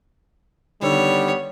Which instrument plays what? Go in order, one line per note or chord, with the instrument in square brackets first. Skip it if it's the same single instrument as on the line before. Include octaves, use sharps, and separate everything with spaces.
[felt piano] D3 D#3 E6 [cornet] G3 [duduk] B3 [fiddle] C#5